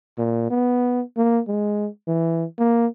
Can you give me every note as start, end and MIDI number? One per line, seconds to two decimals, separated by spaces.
0.18 0.47 46
0.51 1.02 59
1.17 1.40 58
1.48 1.88 56
2.08 2.45 52
2.59 2.87 58